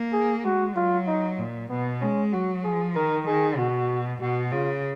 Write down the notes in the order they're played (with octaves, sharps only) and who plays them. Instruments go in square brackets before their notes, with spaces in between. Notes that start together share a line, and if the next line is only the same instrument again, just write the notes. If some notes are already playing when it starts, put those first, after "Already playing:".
Already playing: [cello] A#3
[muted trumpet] G#4
[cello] G#3 [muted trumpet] F#4
[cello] F#3 [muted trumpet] F4
[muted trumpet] D#4
[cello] A#2
[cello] B2 [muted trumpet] B3
[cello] G#3 [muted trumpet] C#4
[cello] F#3 [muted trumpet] F#4
[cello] F3 [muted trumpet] G#4
[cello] D#3 [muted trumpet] A#4
[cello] D#3 [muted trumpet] G#4
[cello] B2 [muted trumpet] F#4
[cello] B2 [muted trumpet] F#4
[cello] C#3 [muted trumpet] F4